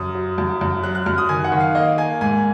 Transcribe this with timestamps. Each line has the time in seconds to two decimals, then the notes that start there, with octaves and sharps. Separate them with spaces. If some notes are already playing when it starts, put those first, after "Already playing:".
Already playing: F#2 D#6
0.15 F#3
0.38 F#2
0.61 F#2
0.83 F#3 F#6
0.95 F#6
1.06 F#2 F6
1.18 D#6
1.29 D#3 G#5
1.44 F#5
1.52 D#3
1.60 F5
1.75 A#3 D#5
1.98 A#3 G#5
2.21 G#2 G#5